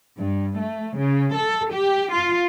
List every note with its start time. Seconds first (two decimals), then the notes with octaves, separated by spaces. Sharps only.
0.18 G2
0.58 A3
0.98 C#3
1.37 A4
1.71 G4
2.12 F4